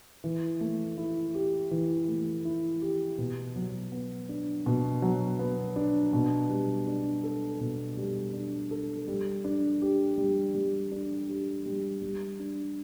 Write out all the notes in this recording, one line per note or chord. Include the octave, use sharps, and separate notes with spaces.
E3
A3
E4
G4
E3
A3
E4
G4
B2
F#3
B3
D4
B2
F#3
B3
D4
B2
G3
D4
A4
B2
G3
D4
A4
G3
D4
G4
G3
G3
D4
G4
G3
G3
D4